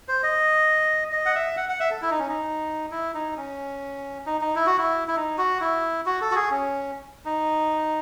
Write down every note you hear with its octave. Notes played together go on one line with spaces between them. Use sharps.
C5
D#5
D#5
F#5
E5
F#5
F#5
E5
A4
E4
D#4
C#4
D#4
E4
D#4
C#4
D#4
D#4
E4
F#4
E4
E4
D#4
F#4
E4
F#4
A4
F#4
G#4
C#4
D#4